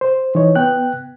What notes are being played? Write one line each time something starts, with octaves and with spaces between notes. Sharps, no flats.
C5
E3 D#4 C#5
B3 G5 F#6